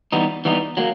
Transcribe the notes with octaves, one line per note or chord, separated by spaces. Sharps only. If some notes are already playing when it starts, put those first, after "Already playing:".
E3 G3 B3 D#4
E3 G3 B3 D#4
F#3 A#3